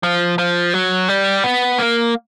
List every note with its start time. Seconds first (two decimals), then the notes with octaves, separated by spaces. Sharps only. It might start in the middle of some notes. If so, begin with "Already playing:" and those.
0.03 F3
0.38 F3
0.74 F#3
1.09 G3
1.44 B3
1.78 A#3